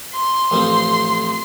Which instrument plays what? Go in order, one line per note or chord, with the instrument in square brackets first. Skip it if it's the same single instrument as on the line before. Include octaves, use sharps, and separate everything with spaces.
[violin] C6
[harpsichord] A1 F2 C4